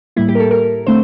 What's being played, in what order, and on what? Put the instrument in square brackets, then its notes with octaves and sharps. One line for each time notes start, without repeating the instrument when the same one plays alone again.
[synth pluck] A2 G3 A#3 E4
G4
A#4
A4
A#4
D3 A3 C4 C5